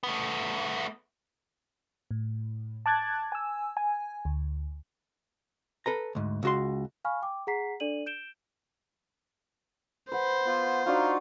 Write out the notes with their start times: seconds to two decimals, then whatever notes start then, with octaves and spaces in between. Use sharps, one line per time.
0.03 A3 B3
2.11 A2
2.86 A5 D6 F#6 G#6 A6
3.32 G#5 E6
3.77 G#5
4.25 D2
5.86 A4 B4 A#5
6.15 D2 G#2
6.43 C#2 F#4 C6
7.05 F5 G#5 B5 C#6 F6
7.22 G5 D6
7.47 G#4 F#5 A#5 B6 C7
7.80 D4 A4 D5 D#7 F#7
8.06 G6 D7 E7 G7
10.12 B4 C5 F#5
10.46 B3 F4
10.86 D4 D#4 F4 F#4 F5 A#5